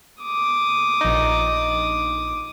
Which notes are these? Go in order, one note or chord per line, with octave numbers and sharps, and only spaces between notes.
D6 D#6
A#1 D#4